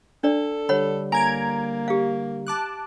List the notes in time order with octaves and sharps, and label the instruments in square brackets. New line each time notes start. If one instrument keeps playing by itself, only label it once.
[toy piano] D4 D5 [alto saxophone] A4
[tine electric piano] D3 G3 [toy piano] C#5 F#5 B5
[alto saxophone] A#3 [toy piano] G#5 [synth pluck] A#5 G#6 D7
[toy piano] G4 F5
[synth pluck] A5 D6 F#6